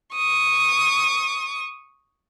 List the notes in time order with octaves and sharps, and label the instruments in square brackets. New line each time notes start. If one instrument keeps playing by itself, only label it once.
[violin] C#6 D#6